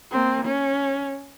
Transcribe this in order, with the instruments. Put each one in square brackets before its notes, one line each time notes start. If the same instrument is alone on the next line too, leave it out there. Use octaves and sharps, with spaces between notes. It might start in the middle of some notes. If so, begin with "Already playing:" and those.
[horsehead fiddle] A#3 C4
C#4